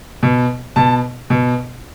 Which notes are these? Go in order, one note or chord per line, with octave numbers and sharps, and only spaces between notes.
B2
B2 A5
B2